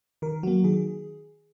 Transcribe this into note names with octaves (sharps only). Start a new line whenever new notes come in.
D#3 A#4
F#3 A#3 F#4
D#3 G#4